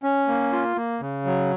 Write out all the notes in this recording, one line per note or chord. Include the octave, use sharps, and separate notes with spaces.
C#4
A#3
F4
A#3
C#3
F#3